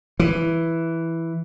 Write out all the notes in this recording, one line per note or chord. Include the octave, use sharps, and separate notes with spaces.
E3